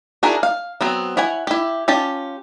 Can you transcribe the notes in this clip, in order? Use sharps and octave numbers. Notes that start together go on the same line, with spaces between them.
D4 E4 F#4 G#4 A#4
F5
F#3 B3 C4
E4 C#5 F#5 G#5
E4 G4
C#4 F4 G4 A5